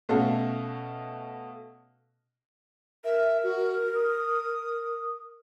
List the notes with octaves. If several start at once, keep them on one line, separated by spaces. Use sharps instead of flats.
B2 A3 C#4 F#4 A4 F5
A#4 E5
F#4
D#6